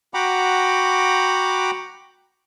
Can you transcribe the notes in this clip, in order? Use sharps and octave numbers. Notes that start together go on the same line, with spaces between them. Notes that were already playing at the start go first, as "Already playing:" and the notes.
F#4 F#5 G5 A#5 B5 D6